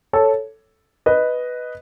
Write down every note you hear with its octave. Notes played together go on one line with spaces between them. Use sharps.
A4 C#5
B4 D#5